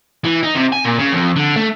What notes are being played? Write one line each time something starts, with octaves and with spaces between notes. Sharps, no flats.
E3
D#4
C3
G#5
A#2
C#3
F2
D3
A3